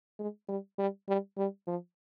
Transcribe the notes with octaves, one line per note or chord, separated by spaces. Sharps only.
G#3
G3
G3
G3
G3
F3